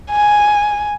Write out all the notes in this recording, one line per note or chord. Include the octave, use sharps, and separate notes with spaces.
G#5